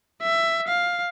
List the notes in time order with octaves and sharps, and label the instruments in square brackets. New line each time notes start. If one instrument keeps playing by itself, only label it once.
[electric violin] E5
F5